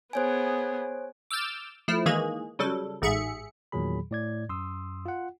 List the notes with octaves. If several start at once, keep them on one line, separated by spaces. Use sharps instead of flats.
B3 G#4 C5 C#5 G#5
D6 E6 F6 G6 A6
F3 A3 E4
D#3 E3 G#3 A#3 G#4
C#3 F#3 G3 A4
A1 G#2 G#4 E5 C#7
E2 A#2 D#3 F#3 G#4 B5
A2 D5 G#6
F#2 C6 D#6 E6
F4 F#5